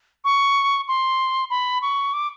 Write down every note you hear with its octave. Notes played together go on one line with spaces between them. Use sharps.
C#6
C6
B5
C#6
D6